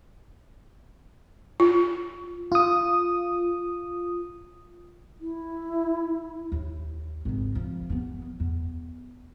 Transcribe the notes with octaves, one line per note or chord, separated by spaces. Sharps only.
F4
F4 D#6
E4
D#2
G#1 D#3
F3
E3 B3
E2